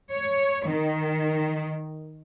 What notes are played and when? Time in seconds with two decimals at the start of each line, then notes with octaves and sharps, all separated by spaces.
0.13 C#5
0.69 D#3